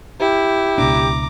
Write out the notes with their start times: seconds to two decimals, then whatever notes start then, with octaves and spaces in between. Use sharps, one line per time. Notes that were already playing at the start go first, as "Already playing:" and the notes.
0.20 E4 G4
0.78 C#2 B2 D4 A#5 D6